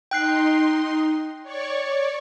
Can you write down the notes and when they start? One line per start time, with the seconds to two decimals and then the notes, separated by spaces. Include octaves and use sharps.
0.11 D#4 G5 C6 F#6 C7
1.42 C#5 D5 C#6